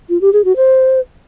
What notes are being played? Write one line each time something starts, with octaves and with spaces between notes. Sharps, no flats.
F4
G4
G#4
F#4
C5